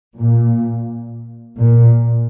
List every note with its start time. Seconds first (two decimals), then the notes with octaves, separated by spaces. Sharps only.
0.18 A#2
1.58 A#2